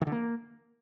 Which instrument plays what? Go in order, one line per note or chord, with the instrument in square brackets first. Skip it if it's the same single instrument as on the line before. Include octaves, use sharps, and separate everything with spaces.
[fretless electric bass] D#3
D3
A#3